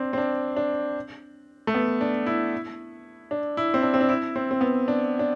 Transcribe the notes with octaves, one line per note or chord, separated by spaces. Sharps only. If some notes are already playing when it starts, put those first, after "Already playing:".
Already playing: C4 D4
C4
D4
D4
A3
B3
D4
E4
D4
E4
C4
D4
C4
D4
E4
C4
C4
B3
D4
D4